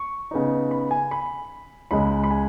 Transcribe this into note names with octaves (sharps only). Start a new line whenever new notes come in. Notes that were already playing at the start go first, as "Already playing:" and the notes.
Already playing: C#6
C#3 B3 D#4
B5
G#5
B5
C#2 C#3 G#3 B5
B5
G#5